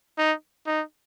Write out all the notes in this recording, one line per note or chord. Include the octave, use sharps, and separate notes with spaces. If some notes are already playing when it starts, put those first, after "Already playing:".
D#4
D#4